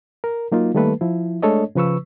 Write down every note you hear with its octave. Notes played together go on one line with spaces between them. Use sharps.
A#4
F#3 A#3 D#4 F4
D#3 G3 A3 A#3 A4 B4
F3 E4
G#3 A3 D4 A4 C#5 D#5
C#3 F3 B4 C#6 E6